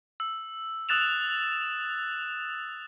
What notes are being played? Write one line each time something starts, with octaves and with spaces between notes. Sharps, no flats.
E6
D#6 E6 F#6 A6 E7 F7